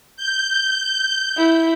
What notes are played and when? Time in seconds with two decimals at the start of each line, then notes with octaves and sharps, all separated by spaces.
0.17 G6
1.37 E4